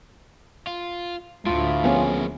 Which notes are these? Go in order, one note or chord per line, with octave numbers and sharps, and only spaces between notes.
F4
D2 A2 F4
F3 A#3 B3 C#4 G#4